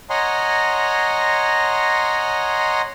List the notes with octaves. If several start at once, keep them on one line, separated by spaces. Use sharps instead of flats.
C#5 D#5 F#5 G#5 A#5 C6